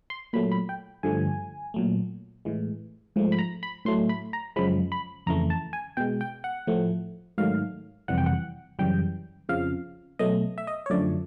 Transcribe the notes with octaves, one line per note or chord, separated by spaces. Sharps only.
C6
A#2 F#3 A3 B5
B5
G5
G2 D3 F3 A3 G#5
A#2 F#3 A3
A2 E3 G#3
G#2 F3 A3
B5
A#5
B5
A2 F#3 A3 C6
B5
A#5
F#2 C#3 F3 G#3 B5
B5
F2 C#3 E3 A3 A#5
A5
G#5
B2 G#3 G5
G5
F#5
A2 F3 A3
G#2 D#3 F#3 A3 F5
F2 C3 E3 G3 F#5
G5
F#5
F#2 C#3 E3 G3 G5
F2 C#3 F3 F5
B2 F#3 A3 D#5
E5
D#5
C#5
F#2 D3 F3 A3 D5